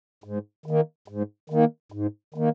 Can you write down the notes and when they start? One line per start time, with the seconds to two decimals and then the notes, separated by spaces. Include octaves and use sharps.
0.24 G#2
0.66 D#3 A#3
1.08 G#2
1.50 D#3 A#3
1.92 G#2
2.34 D#3 A#3